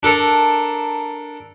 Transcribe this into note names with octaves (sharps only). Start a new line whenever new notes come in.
D4 A4 A#4